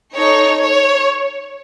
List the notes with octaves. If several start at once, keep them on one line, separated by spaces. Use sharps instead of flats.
D#4 A4 C#5
C#5